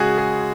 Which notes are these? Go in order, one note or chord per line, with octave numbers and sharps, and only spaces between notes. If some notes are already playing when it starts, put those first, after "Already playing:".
Already playing: C#3 G#3 F#4 G#4
G#4